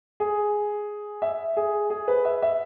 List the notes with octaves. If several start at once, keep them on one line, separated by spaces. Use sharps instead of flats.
G#4
E5
G#4
G#4
B4
E5
E5